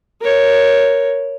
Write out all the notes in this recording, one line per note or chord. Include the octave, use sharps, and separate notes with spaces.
A#4 C#5